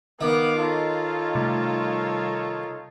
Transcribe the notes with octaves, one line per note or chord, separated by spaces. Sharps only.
D#3 B3 F5 D6
D#4 F4 A4 C#5
C3 G3 A3